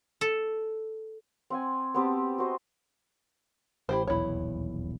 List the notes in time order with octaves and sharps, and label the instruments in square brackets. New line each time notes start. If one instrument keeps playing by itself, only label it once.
[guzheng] A4
[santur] C4 F#5 G#5
B3 C4 G4 A5
F#4 C5 D#5
[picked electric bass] A1 [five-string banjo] E4 G4 C5
[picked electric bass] D#1 B1 E2 [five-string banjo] E4 C#5